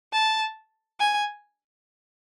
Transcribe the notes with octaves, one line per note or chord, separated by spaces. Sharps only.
A5
G#5